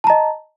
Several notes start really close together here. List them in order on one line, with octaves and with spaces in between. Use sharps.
A5 A#5 D#5